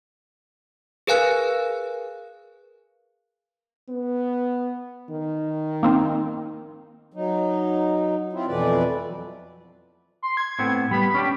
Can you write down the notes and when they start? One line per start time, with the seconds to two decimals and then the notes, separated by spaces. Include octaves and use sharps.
1.07 G#4 A#4 B4 F5 G#5 F#6
3.89 B3
5.10 D#3
5.83 A#3 C4 D#4
7.13 F#3 D#4
8.33 C4 E4 F4
8.47 F2 B2 E3 A3 B4 D5
9.05 F#3
10.23 C6
10.37 G#6
10.59 A2 B3 C4
10.91 G3 B3 B5
11.14 C#4 D4 G4